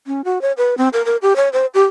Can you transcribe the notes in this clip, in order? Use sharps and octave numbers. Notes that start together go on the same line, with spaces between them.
C#4
F#4
C#5
B4
C4
A#4
A#4
G4
C#5
C5
G4